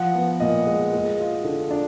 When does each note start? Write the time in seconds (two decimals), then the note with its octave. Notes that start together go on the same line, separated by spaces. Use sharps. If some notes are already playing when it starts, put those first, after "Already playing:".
Already playing: F3 F#5
0.15 B3
0.40 A#2 D#5
0.67 G#3
0.93 G#3
1.19 F4
1.44 D3
1.71 D4